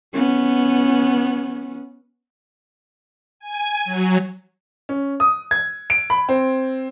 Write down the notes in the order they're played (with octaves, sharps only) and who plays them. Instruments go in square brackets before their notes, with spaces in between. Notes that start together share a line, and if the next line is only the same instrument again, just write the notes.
[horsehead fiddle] B3 C#4
[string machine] G#5
F#3
[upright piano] C#4
D#6
G#6
D7
B5
C4